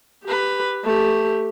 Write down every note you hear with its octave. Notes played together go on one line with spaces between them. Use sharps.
G4 B4
A3 G4